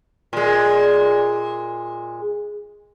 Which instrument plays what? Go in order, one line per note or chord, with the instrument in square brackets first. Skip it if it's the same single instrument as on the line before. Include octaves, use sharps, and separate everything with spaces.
[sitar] A#2 G#3